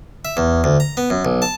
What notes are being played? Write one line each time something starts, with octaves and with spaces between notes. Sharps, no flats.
E5
E2
D2
A#5
B3
F#2
B1
A5